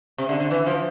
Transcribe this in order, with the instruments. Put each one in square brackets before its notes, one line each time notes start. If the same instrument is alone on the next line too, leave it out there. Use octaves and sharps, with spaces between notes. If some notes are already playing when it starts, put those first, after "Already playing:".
[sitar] C3
D3
D3
E3
F3